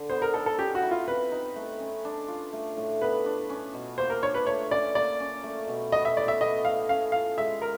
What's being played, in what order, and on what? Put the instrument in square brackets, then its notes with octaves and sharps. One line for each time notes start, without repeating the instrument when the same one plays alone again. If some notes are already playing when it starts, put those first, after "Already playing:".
Already playing: [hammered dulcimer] D3
[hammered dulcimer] B3 [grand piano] C5
[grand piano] A#4
[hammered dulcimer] D#4 [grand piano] A4
[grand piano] A4
[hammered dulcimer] C#4 [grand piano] G4
[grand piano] F#4
[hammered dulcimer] E4
[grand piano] F4
[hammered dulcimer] C4 [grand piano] B4
[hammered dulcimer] D#4
A3
C#4
D4
F4
A3
A2
[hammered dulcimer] B3 [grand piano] B4
[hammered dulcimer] D4
C#4
B2
[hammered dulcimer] A#3 [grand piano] C5
[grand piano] A#4
[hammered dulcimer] D4 [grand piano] C#5
[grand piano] B4
[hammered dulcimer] A3 [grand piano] C#5
[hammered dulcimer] C#4 [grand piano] D5
[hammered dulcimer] A#3 [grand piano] D5
[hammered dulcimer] C#4
A3
B2
[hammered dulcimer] B3 [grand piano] D#5
[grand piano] E5
[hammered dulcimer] A2 [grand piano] D5
[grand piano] E5
[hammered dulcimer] B3 [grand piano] D#5
[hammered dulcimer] A2 [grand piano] F5
[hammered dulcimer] C#4 [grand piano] F5
[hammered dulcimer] F4 [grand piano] F5
[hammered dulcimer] G#3 [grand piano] E5
[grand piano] A#4